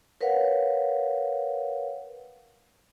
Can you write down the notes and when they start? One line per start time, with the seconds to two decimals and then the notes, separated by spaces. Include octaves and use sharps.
0.21 A#4 B4 C#5 F5 F#5